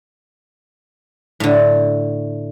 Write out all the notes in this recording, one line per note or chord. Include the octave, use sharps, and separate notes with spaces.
A2 D3